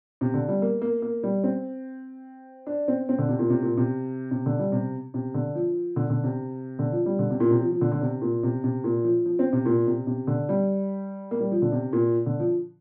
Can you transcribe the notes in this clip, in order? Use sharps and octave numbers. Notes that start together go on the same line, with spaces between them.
C3
D3
G3
A#3
A#3
A#3
G3
C4
D4
C4
C4
D3
C3
A#2
C3
A#2
C3
C3
D3
G3
C3
C3
D3
F3
D3
D3
C3
D3
F3
G3
D3
C3
A#2
C3
F3
F3
D3
D3
C3
A#2
C3
C3
A#2
F3
F3
C4
C3
A#2
C3
C3
D3
G3
A#3
G3
F3
D3
C3
A#2
D3
F3